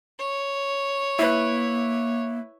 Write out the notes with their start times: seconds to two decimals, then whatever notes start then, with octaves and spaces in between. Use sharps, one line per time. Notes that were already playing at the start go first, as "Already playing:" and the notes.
0.19 C#5
1.19 A#3 E4 B4